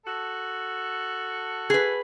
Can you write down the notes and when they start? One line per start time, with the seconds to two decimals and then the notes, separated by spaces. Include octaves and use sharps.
0.06 F#4 A4
1.70 G#4 B4